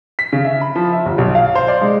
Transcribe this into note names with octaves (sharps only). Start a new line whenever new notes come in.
B6
C#3
E5
B5
F3
E5
G1
B1
F5
C5
D5
G#3